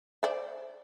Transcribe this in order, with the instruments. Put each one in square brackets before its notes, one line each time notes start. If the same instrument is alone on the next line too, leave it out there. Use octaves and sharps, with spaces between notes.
[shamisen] C5 D5 E5